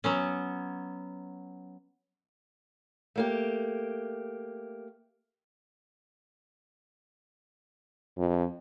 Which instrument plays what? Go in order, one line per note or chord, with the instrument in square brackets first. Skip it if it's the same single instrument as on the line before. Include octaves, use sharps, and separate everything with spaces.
[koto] F#3 B3 C#4
[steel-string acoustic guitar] A3 A#3 G4
[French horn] F2